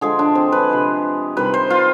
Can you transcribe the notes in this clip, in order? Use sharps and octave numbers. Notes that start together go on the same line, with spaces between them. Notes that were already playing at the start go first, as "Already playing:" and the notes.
D3 F3 G#3 G#4
D4
C4
B4
C3 F3 G#3
C3 D#3 G3 B4
C5
F4